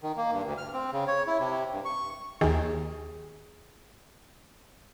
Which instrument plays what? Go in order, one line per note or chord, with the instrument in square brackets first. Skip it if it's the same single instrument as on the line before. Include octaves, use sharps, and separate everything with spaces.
[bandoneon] D#3
A#3
G2
D2
F6
C4
C#3
C#5
E4
C3
G2
C#6
[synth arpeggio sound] D#2 D#3 [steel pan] G#4